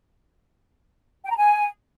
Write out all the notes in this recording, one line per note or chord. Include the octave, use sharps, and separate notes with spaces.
G5
A#5
G#5